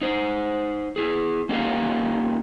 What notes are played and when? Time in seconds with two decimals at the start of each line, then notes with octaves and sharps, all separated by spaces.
0.01 D#4 C5
0.96 E4 G#4
1.49 A#3 C#4 D#4 G4 A4 F5